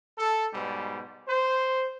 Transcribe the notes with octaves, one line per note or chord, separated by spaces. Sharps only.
A4
G#2 B2 G3
C5